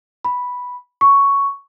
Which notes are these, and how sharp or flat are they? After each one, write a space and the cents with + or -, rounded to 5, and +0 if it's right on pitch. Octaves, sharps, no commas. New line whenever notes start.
B5 -5
C#6 +5